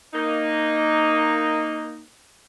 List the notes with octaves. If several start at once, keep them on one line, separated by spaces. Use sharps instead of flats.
A#3 D#4